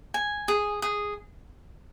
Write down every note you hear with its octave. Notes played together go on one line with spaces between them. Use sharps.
G#5
G#4
G#4